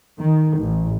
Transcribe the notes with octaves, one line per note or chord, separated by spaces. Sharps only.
D#3
A1